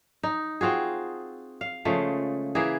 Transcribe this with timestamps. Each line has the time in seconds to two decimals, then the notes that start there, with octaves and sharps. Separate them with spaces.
0.23 D#4
0.61 C4 F4 F#4 G#4
1.61 F5
1.85 C#3 F3 G#3 A3
2.55 E3 A#3 E4 G#4